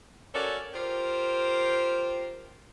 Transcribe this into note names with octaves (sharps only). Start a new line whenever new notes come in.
C#4 F#4 A4 A#4 C#5 D5
F4 G4 A#4 C5